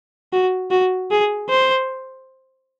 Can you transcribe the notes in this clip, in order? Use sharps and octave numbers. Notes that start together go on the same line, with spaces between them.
F#4
F#4
G#4
C5